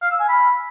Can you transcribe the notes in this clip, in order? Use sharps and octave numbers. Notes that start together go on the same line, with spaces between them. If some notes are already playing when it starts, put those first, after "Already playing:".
F5
E6
G#5
B5